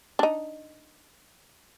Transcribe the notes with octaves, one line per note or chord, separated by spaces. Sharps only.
D4 D#4